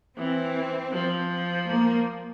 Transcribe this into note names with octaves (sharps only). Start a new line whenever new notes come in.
E3 C4
F3
A#3